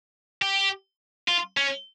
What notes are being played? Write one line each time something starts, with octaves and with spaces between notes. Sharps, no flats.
G4
F4
C#4